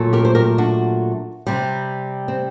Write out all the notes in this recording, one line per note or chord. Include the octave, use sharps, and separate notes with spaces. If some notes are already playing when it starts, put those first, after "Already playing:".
Already playing: A#2 F#3 A3
G4 A#4
C5
G4 A#4
D4 F#4
C3 G3
C4